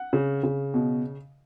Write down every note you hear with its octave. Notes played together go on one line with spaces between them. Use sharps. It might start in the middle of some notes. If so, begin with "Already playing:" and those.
Already playing: F#5
C#3
C#3
B2